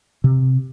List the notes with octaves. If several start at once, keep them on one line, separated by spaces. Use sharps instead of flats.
C3